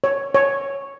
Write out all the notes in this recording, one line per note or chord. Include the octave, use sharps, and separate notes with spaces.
C#5
C#5